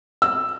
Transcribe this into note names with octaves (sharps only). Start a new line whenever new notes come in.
E6